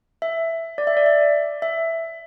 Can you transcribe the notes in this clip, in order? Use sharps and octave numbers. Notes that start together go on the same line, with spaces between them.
E5
D5
E5
D5
E5
E5